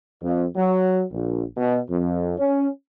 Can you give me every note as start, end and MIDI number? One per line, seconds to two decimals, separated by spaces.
0.23 0.44 41
0.55 1.02 54
1.12 1.44 34
1.57 1.78 47
1.89 2.32 41
2.37 2.67 61